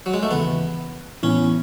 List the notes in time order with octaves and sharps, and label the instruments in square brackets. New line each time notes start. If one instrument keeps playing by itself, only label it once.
[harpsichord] F#3
G#3
A3
[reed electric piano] D#2 C#3 E3 [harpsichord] B3
[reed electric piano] A2 E3 B3 E4 [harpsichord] C#4